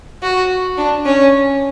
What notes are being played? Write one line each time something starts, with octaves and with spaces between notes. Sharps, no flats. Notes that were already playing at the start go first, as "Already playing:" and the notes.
F#4
D4
C#4